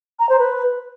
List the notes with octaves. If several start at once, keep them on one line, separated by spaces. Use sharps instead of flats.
A#5
C5
B4